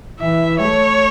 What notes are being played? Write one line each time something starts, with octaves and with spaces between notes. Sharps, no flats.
E3 E5
A3 C#5